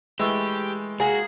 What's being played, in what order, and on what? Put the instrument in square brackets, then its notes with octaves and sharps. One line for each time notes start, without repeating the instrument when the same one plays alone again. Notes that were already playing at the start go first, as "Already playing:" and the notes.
[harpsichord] E3 A3 [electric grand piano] G#3 [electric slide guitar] G4
[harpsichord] A#3 [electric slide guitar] F#4 [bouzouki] G#4